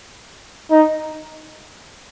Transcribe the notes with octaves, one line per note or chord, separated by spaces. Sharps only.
D#4